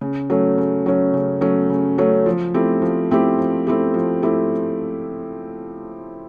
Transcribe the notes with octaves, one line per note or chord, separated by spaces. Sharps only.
C#3
F#3 A3 C#4
C#3
F#3 A3 C#4
C#3
F#3 A3 C#4
C#3
F#3 A3 C#4
F3
A3 C4 E4 G4
F3
A3 C4 E4 G4
F3
A3 C4 E4 G4
F3
A3 C4 E4 G4